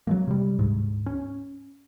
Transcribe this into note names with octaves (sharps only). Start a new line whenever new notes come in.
F#3 A3 A#3
C3 G3
D2 G#2
C#4